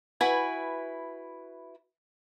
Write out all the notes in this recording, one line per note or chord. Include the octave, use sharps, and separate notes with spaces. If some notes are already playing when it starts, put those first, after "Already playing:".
E4 F#4 B4 G#5